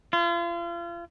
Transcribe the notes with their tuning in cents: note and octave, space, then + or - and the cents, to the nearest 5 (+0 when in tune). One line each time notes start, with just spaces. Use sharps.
F4 -35